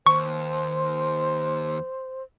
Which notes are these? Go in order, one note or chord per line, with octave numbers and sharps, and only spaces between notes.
D#2 C5 C#6